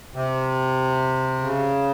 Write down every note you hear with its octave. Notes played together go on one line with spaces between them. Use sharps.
C3
C#3